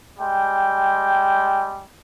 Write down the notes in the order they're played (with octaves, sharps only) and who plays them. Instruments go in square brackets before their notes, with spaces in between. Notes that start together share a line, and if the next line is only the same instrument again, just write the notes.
[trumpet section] G3 G#3 G5